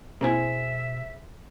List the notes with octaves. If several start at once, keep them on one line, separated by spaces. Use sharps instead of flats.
B2 A#3 C4 E4 G#4 C5 E5 G#5